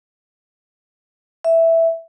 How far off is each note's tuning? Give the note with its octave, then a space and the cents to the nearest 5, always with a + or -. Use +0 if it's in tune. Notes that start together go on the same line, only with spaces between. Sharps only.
E5 +0